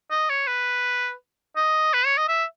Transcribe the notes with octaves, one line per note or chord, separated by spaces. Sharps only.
D#5
C#5
B4
D#5
B4
C#5
D#5
E5